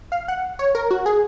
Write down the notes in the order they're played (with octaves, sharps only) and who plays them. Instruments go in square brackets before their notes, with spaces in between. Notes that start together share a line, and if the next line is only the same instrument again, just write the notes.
[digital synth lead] F5
F#5
C#5
A#4
F#4
G#4